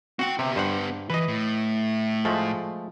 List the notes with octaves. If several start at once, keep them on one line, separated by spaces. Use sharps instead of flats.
C4 F#4 F#5 G5
C3 B3 G4
G2 C5 F#5
E3 B4 D#5
A2
F3 G#3 A3